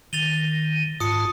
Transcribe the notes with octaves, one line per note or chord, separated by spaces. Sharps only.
D#3 A6 F7 G7
G#2 F4 A5 D#6 C#7